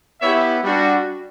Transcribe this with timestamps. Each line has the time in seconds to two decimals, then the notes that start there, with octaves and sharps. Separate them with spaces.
0.22 B3 E4 G4 C#5 E5
0.63 G3 D4 F#4